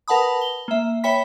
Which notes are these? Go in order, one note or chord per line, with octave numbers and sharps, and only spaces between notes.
A#4 B4 F#5 A5 B5 D#6
G7
A#3 E5
C#5 E5 G5 B5 B6